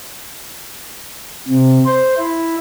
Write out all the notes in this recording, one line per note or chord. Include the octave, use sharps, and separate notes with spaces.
C3
C5
E4